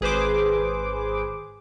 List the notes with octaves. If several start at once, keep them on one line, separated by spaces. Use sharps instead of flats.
G#1 G#4 B4 C5 D6